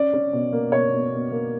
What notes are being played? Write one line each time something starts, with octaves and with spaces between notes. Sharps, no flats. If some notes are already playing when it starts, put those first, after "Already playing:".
Already playing: C#4 D5
C#4
B2
A#3
B2 C#5
B2
B2
A#3